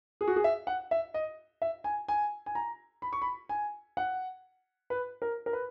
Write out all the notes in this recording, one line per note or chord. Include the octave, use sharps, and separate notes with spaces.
G#4
F#4
G#4
E5
F#5
E5
D#5
E5
G#5
G#5
G#5
A#5
B5
C#6
B5
G#5
F#5
B4
A#4
A#4
B4